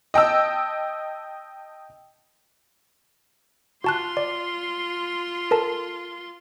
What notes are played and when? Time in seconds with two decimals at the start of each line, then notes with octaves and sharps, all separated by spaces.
0.14 D#5 G5 A5 E6
3.84 F4 F#4 A5 C6 F#6
4.17 D5
5.51 A4 A#4 A5